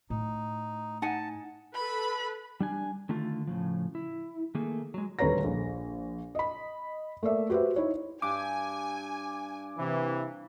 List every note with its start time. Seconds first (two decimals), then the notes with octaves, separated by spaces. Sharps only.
0.10 A2 D#4
1.02 D#4 F#5 G#5 A5
1.75 A4 B4 B5
2.60 G3 D4 G#5
3.09 D3 D#3 A3 F4
3.47 A2 C#3 F3
3.95 E4
4.55 D#3 A3 A#3 G#4
4.94 F#3 G#3
5.19 D#1 D2 B4 C#5 A#5 A#6
5.44 A#1
6.35 D#5 B5
7.23 A3 A#3 D5 E5
7.50 F#4 G4 B4 C5 E5
7.76 D#4 E4 C#5
8.22 G2 G#5 D6
9.77 C3 E3